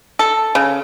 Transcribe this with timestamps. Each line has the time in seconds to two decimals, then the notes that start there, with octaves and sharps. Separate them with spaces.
0.19 A4
0.55 C#3